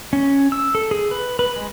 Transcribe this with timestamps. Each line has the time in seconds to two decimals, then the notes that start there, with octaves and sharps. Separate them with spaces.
0.13 C#4
0.52 E6
0.75 A4
0.91 G#4
1.11 B4
1.39 B4
1.56 G#3